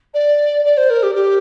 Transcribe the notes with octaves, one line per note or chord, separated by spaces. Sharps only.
D5
D5
C5
A#4
G4
G4